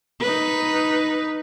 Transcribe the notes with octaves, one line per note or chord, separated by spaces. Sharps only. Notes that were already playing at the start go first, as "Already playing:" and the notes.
D#4 B4